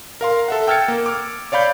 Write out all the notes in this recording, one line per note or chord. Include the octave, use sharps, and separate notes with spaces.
A#4 F5 C6
A4 E5 F#5
G5 E6 F6 G#6 A6 C#7
A#3
D6 F6
C#5 D5 F5 B5 G6